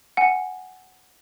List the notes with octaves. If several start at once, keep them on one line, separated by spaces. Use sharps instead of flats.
F#5 G#5